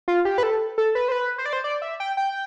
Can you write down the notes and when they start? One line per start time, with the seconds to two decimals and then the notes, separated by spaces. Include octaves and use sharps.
0.08 F4
0.25 G4
0.38 B4
0.43 A4
0.78 A4
0.95 B4
1.08 C5
1.12 B4
1.38 C5
1.46 D5
1.53 C5
1.64 D5
1.82 E5
2.00 G5
2.17 G5